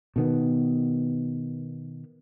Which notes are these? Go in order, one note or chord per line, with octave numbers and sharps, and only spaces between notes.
B2 D#3 B3